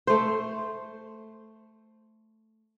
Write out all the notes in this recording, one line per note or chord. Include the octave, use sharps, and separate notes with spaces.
A3 C5